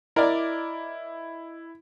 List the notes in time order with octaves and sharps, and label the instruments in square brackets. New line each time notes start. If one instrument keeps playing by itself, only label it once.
[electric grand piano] E4 [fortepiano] A#4 D5 [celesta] D#5